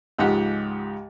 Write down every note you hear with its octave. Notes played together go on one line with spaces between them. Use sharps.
C#2 G#2 F3 G4 F#5